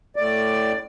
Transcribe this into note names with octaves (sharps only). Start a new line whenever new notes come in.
A2 D5